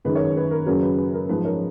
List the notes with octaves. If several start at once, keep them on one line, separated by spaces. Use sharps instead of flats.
F#2 D#3 G#3 B4
A#4 C#5
B4
B4
A#4
F#2 C#3 F#3 A#4
B4
B4
A#4
G#2 F3 G#3 B4
A#4 C#5